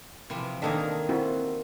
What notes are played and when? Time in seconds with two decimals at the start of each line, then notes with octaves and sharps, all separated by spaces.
0.30 C3 E3 F3
0.62 D#3 A#3 D4 G#4 A4 D#5
1.09 C4 E4 F#4